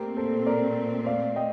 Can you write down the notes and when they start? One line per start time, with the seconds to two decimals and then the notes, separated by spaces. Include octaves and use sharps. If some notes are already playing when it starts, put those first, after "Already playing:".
Already playing: A#2 A3 C4 G4 A#4
0.17 A4 C5
0.47 A#4 D5
1.06 D5 F5
1.36 D#5 G5